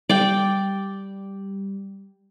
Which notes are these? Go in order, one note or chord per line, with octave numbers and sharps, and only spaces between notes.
G3 D5 G5